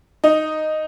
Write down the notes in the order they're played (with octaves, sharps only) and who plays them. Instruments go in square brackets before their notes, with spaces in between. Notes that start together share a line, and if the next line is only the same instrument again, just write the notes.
[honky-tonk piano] D#4